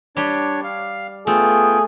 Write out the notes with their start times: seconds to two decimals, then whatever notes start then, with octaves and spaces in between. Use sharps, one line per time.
0.17 G3 D4 G4 C#5
0.64 F5
1.27 A3 B3 F4 G#4 G5